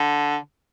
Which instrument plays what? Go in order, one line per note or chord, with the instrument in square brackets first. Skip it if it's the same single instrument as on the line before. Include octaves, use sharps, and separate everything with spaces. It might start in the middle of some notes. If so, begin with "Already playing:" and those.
Already playing: [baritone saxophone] D3